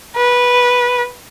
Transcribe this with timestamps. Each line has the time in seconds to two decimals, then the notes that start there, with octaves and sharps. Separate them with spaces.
0.17 B4